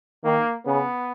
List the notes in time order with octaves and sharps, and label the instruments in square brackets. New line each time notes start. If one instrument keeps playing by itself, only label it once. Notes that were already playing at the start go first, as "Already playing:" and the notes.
[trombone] D#3 [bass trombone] A#3
[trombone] C#3 [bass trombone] B3